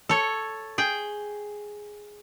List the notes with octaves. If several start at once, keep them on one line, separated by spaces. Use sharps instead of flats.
A4 C#5
G#4 G5